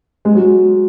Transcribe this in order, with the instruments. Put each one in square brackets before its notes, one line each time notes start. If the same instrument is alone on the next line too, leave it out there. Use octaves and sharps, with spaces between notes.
[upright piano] G#3
F#3